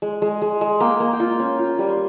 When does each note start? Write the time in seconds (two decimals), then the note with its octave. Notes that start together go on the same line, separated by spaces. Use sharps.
0.02 G#3
0.22 G#3
0.42 G#3
0.61 G#3
0.80 A#3 G5
1.00 A#3
1.13 G5
1.20 F4 F5
1.40 C#4
1.59 F4
1.69 G5
1.79 G3 G#5
1.89 C6